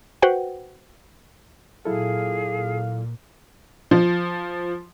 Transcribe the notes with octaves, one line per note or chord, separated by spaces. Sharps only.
F#4 B4 C5 F#5 G5
A#2 F#3 E4 G#4 A4 F5
F3